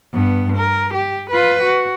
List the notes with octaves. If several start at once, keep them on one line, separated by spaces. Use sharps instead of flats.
G2 B3
A#4
G4
F4 B4
F#4